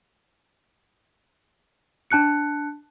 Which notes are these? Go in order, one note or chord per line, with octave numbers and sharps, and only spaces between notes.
D4 A5 F#6 C#7